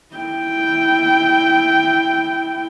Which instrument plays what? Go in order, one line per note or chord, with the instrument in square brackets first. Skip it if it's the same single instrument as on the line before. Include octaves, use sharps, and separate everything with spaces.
[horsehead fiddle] E4 G5